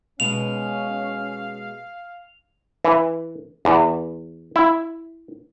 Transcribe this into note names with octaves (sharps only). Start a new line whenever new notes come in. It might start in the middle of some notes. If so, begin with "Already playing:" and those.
B2 G#3 C#4 F5 F7
E3
E2
E4